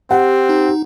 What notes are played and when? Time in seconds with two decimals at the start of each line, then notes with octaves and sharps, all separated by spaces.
0.11 C4 G4 F#5
0.49 D#4